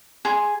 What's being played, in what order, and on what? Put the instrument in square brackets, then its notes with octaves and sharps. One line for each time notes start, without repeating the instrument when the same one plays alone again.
[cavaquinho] G#4 C6